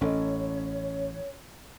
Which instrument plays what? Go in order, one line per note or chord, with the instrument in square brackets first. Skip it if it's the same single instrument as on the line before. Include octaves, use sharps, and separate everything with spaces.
[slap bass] A1 [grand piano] C#4 A4 D#5 [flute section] C#5